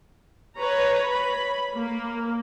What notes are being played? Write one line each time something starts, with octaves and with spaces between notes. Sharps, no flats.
B4 C#5 A#5
B5
A#3